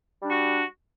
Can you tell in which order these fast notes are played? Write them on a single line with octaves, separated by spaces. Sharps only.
G3 D4 F#4